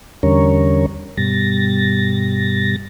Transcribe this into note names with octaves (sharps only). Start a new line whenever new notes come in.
E2 D3 G3 C#4 A#4 C#5
G2 B2 G3 A6 A#6